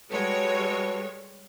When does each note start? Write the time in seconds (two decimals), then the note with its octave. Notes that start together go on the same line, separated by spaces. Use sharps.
0.11 G3 G#3 F#4 A4 B4 C#5